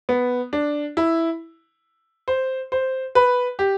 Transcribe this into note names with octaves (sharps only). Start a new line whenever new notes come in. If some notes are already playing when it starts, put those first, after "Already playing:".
B3
D4
E4
C5
C5
B4
G4